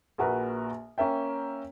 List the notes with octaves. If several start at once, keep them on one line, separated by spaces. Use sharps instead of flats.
A#1 A#2 F#4 A#4 B4
A#3 C#4 A#4 E5 G5